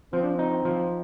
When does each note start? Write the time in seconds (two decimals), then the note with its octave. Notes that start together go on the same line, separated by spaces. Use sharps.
0.13 F3 C4
0.22 D4
0.31 C4
0.39 D#4
0.65 F3